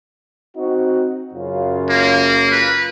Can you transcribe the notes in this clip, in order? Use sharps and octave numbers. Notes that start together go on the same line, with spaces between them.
C4 D#4 F#4
F#2 C#3 F4
A#3
B4